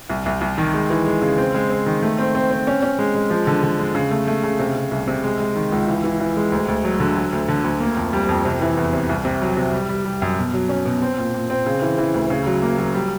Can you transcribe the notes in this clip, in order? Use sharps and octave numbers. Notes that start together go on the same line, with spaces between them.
C2
C2
C2
D#3
G#3
E3
G#3
C#3
C4
G#3
C4
D#3
A3
C4
C4
C4
C#4
C#4
G#3
G#3
F3
D3
D3
G#3
C#3
A3
A3
C#3
C3
C3
C2
C3
G#3
G#3
D#3
C#2
E3
E3
E3
G#3
D2
D2
F#3
D3
F#3
D2
D3
D2
A#3
F2
G3
F2
C3
E3
E2
C3
C2
C3
F#3
C3
G3
G3
G3
F#2
B2
F#3
C#4
B2
C4
A#2
A#2
C4
C#3
E3
E3
D2
C#3
F#3
A#3
F#3
G3